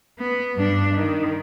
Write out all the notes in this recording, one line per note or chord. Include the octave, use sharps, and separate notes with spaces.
B3
G2 D4
D#3